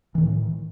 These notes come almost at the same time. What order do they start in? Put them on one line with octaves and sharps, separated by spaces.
E3 D#3 A2